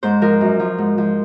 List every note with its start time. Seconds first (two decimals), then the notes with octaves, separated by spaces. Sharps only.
0.03 G#2 C5
0.22 F3 A#4
0.41 F#2
0.60 F3
0.78 G#2
0.98 F3